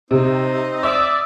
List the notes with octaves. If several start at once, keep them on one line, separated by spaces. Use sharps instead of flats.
C3 C4 D#4
D5 E5 D#6 E6